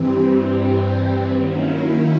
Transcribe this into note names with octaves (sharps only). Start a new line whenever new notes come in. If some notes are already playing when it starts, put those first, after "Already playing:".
Already playing: G2 E3 G3 C4
D#3 F#3 A#3 C#4 E4